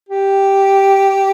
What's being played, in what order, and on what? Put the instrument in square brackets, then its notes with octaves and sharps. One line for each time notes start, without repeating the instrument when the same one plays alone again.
[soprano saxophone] G4